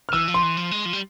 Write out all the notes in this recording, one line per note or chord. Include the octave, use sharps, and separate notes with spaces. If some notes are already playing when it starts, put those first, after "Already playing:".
F6
E3 E6
F3
C6
E3
F3
G#3
F3
G3